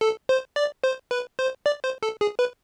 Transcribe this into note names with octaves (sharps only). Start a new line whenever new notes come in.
A4
C5
D5
C5
B4
C5
D5
C5
A4
G#4
B4